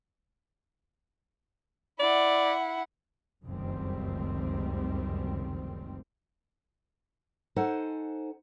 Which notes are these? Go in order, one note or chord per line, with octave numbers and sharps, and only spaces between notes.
E4 D5 F#5
F1 C#2 F#2 D#3 G3 C4
D#4 A4 C5 F#5 G#5